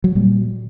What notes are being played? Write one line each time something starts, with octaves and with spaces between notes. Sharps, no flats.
F#3
A#2 G3